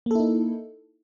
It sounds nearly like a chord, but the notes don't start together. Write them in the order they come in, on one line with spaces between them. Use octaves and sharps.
A#3 A4 E4 D#4